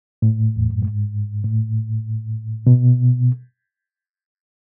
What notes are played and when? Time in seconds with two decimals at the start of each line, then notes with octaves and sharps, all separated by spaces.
0.22 A2
0.56 E2
0.70 F#2
0.82 G#2
1.44 A2
2.67 B2